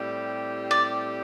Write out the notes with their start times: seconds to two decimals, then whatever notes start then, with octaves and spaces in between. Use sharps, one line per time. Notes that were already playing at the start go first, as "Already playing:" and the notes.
Already playing: A2 G3 C4 G4
0.71 D5